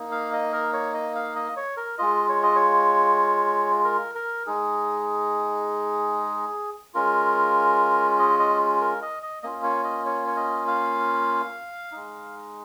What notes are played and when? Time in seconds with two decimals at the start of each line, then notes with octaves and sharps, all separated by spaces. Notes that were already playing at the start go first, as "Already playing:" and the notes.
Already playing: A#3 D#4
0.12 F5
0.33 D#5
0.53 A#4
0.73 C#5
0.94 D#5
1.15 F5
1.36 D#5
1.57 C#5
1.77 A#4
1.98 G#3 F4 D#5
2.29 C#5
2.43 D#5
2.56 C#5
3.84 A#4
4.15 A#4
4.47 G#3 D#4 G#4
6.94 G#3 C#4 F4 A#4
8.19 D#5
8.39 D#5
8.81 A#4
9.02 D#5
9.23 D#5
9.43 A#3 C#4 F4 D#5
9.63 C#5
9.84 D#5
10.06 C#5
10.27 C#5
10.36 D#5
10.67 F5
11.92 G#3 D#4